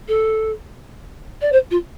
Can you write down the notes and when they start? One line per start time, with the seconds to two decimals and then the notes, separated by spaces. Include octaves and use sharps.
0.08 A4
1.41 D5
1.52 C5
1.71 F4